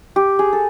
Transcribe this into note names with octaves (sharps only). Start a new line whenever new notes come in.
G4
G#4
A4